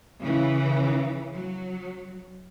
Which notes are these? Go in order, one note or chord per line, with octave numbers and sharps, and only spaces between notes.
C#3 E3
F#3